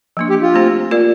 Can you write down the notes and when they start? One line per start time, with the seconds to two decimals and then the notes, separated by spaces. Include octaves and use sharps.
0.17 F3 A#3 D4
0.30 G4
0.42 F4
0.54 A3 C4 G4 C5
0.91 A#3 F4 A#4 D5